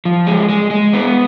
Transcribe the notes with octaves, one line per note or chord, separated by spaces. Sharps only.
F3
G#3
G#3
G#3
B3